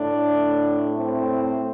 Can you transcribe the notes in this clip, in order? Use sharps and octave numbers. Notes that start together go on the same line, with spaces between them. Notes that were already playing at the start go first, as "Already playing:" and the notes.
Already playing: A2 D4
C4